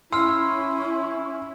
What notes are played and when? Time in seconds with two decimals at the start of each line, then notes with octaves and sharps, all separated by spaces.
0.12 C#4 E4 C6 E6 F6